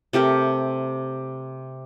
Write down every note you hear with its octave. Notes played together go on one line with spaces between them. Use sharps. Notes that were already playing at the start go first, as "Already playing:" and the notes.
C3 A3 G4 A#4